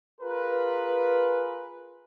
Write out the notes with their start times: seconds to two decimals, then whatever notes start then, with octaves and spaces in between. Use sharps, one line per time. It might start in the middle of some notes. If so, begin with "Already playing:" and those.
0.21 F4 G#4 A#4 B4